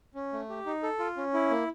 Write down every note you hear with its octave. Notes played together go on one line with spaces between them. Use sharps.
C#4
A3
G4
D#4
A4
F4
C#4
E4
A#3